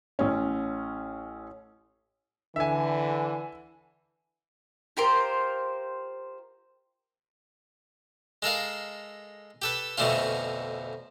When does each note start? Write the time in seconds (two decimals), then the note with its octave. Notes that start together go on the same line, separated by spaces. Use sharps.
0.19 A1 C#4
2.56 D3 E3 E5 G#5
4.97 F4 G4 A#4 C5
8.42 G#3 A4 A#4 F5
9.62 G4 A4 B4
9.98 F2 B2 D3 A3 C#4 F4